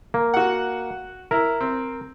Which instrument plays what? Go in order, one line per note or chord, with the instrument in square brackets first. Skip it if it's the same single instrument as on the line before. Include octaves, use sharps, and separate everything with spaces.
[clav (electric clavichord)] A#3
[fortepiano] F#4 F#5
[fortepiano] E4 [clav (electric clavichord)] A#4
[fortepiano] C4